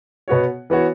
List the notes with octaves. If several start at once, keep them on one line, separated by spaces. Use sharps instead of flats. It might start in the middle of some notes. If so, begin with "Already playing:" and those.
B2 B3 F#4 C#5
E3 B3 F#4 C#5